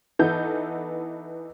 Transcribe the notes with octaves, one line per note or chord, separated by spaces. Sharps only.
E3 B3 D#4 A4 G6